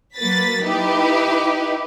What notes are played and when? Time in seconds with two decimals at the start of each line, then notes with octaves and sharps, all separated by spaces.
0.16 F#3 A#3 B4 A6 B6
0.65 D#4 E4 G4 B4